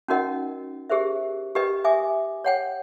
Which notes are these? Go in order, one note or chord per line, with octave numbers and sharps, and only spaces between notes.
C#4 D#4 F#4 A#4 D#5 F#5
G4 G#4 A#4 C5 E5
G4 A#4 B4 D#5 G5
E5 G#5 D6 D#6
C#5 F#5 G5